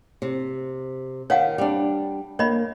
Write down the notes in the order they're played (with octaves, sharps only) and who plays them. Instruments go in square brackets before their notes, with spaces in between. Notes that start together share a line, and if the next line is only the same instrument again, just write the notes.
[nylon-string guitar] C3
[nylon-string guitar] D#3 [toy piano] C#5 F5 F#5
[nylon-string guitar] G3 D4
[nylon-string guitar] A#3 [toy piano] C#5 D#5 B5